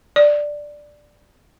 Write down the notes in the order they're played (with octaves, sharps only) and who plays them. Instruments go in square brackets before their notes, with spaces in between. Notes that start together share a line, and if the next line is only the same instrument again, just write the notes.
[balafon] D5